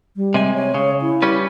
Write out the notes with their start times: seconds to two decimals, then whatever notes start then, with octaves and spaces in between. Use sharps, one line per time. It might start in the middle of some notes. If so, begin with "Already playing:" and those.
0.16 G3
0.34 C3 G#3 G#5
0.54 C#5
0.74 C#3
1.01 E4
1.22 G3 C#4 B4